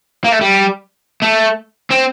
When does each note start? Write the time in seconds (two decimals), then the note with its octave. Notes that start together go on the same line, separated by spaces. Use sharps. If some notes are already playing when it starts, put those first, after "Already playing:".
0.24 A#3
0.32 A3
0.41 G3
1.22 A3
1.90 C4